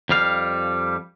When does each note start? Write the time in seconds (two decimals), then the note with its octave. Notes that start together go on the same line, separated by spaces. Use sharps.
0.09 F2 G3 F5